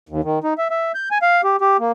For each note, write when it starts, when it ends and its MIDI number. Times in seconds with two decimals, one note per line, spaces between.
0.09 0.21 39
0.24 0.39 51
0.44 0.54 63
0.58 0.68 76
0.70 0.92 76
0.95 1.09 91
1.11 1.18 80
1.22 1.41 77
1.44 1.56 67
1.61 1.77 67
1.79 1.92 58